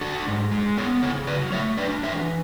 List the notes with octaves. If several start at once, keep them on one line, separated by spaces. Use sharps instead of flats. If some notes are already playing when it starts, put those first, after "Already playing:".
D4 F#4 A4
G#2
G#3
B3 A4 C#5
C#3 A4 C#5
F#3 B4 D5
A3 C#5 E5
D4 B4 D5
E3 C#5 E5